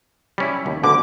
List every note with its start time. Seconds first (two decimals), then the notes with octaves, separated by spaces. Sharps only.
0.38 G3 C#4 E4
0.66 D#2
0.83 D2 B2 D3 D6